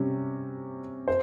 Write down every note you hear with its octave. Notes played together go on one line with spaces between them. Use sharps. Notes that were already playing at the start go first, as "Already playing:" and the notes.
Already playing: C3 G3 C#4
C5